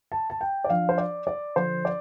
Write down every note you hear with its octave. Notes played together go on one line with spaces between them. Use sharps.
A5
A5
G5
D5
F3 D4 F5
C5
D5
D5
D3 F3 D4 C5
D5